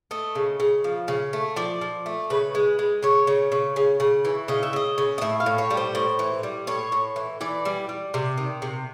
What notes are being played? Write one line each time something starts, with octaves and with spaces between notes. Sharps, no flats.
A3 D#5
C#3
C#3
F3
C#3
A3
F3 D5
F3
A3
C#3 B4
G#3
G#3
C#3 C#5
C#3
C#3
C#3
C#3
E3
C#3 D#5
E5
C#3 D#5
C#3
D#5
A2 E5
F5
A2
C#5
G3
C5
A2
E3
G3
A2 C#5
A2
E3
E3 D5
G3
G3
C3
D#3
C3